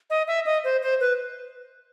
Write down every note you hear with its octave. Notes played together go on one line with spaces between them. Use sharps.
D#5
E5
D#5
C5
C5
B4